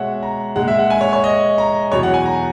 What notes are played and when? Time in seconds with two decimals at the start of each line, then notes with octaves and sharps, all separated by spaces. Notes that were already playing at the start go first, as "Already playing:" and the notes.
Already playing: B2 G#3 C#5 E5 F#5
0.23 A#5
0.56 A#2 G#3 F#5
0.68 E5
0.79 F#5
0.90 G#5
1.01 C#5
1.13 C#5
1.24 D#5
1.58 A#5
1.92 E2 B2 F#3 C#5
2.03 F#5
2.14 G#5
2.26 A#5